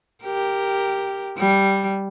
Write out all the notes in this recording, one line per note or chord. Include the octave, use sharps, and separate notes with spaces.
G4 A#4
G3